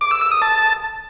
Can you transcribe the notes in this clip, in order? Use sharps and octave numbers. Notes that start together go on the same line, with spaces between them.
D6
E6
E6
D#6
A5